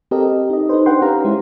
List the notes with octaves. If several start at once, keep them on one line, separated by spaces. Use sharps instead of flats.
C4 G4 A4 A#4 D#5
D#4 D#5
D#4 A4 B4 C5
D4 B4 C5 F#5 G5 C6
C#4 G4 F5 A#5
G#3 E4